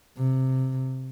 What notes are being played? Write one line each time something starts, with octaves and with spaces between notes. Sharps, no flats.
C3